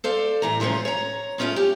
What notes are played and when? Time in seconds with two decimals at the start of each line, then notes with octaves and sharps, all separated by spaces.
0.04 A4 C5 D5 F5
0.42 A2 E3 A#5
0.60 C3 F3 A3 C#4 F4
0.85 C#5 A#5
1.38 G#3 A3 C#4 E4 F4
1.56 G4